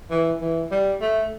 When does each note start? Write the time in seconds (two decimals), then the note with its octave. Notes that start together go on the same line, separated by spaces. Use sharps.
0.10 E3
0.41 E3
0.71 G3
1.01 A3